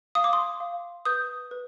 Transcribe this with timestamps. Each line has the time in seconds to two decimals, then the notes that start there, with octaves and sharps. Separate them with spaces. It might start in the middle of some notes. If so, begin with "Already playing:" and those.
0.15 F5 D#6
0.24 D6
0.33 C6 D#6
0.60 F5
1.05 B4 D#6 G6
1.51 B4